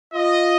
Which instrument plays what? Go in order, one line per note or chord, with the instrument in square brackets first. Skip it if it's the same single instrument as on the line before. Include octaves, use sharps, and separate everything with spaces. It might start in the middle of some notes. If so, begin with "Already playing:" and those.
[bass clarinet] F4 [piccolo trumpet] D#5